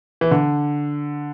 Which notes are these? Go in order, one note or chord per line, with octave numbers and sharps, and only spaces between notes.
E3
D3